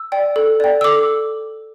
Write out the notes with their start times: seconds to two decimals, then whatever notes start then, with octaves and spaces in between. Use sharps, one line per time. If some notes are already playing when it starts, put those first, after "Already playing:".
Already playing: E6
0.12 D5 G5
0.36 A4
0.60 D5 G5
0.81 E6
0.84 A4 D6